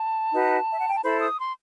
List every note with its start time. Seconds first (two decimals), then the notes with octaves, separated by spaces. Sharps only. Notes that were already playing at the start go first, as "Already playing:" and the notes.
Already playing: A5
0.32 D#4 F#4 B4
0.71 E5
0.79 F#5
0.87 G5
0.95 A5
1.03 E4 A4 C5 B5
1.20 D#6
1.38 C6